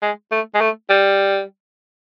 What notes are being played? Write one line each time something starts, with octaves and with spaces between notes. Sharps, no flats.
G#3
A3
G#3
A3
G3